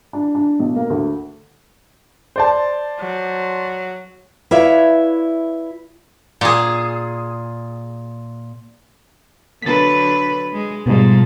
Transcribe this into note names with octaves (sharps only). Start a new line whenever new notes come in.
D4
D4
B1
A#3
D2
C5 D5 A5
F#3
E4 B4 C#5 D5 E5 F5
A#2 G#4
D3 F#3 B4 A6 B6
G#3
G#2 B2 F3 G3